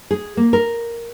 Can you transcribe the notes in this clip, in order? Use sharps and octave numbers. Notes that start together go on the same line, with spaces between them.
G#4
A#3
A#4